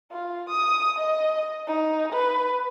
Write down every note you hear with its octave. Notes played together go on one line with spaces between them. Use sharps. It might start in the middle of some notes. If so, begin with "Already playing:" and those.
F4
D#6
D#5
D#4
B4